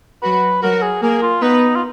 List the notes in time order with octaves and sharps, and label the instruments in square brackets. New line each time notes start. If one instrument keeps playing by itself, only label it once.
[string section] F#3 F#4 [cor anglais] B4
[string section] F#3 F#4 [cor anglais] A#4
[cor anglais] G#4
[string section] A#3 A#4 [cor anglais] G#4
[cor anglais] F4
[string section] B3 B4 [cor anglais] D#4
[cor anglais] F4